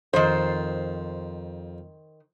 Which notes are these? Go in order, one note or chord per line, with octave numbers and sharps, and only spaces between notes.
F2 D#3 C5